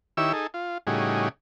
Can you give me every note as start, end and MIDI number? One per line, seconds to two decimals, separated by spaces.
0.17 0.33 51
0.17 0.33 64
0.17 0.33 67
0.17 0.33 73
0.17 0.33 88
0.33 0.47 63
0.33 0.47 68
0.33 0.47 69
0.54 0.78 65
0.87 1.29 45
0.87 1.29 49
0.87 1.29 55
0.87 1.29 63
0.87 1.29 66
0.87 1.29 68